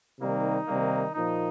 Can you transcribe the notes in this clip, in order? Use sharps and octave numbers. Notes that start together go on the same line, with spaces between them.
C3 D#3 G3 A#3 D#4
C3 D#3 G3 A#3
A#2 F3 A#3 D#4